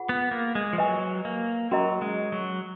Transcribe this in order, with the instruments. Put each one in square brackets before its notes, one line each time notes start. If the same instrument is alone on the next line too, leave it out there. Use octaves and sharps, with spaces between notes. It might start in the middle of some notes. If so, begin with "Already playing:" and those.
Already playing: [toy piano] F4 G#4 B4 F#5 B5
[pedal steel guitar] B3
A#3
G#3
F3
[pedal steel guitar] F#3 [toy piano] B4 D#5 G#5
[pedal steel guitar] A#3
[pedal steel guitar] F#3 [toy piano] C#4 F#4 A#4 D#5 A#5
[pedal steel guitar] G#3
F#3